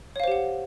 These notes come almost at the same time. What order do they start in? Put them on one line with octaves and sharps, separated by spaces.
C#5 F5 C5 G4 F#5